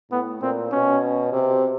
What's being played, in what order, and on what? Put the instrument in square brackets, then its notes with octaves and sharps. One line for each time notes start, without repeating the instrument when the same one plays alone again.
[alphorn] A2 [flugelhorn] B3
[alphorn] A#2 [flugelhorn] C4
[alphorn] B2 [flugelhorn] C#4
[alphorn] C3